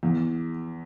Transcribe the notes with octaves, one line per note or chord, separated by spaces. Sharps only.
E2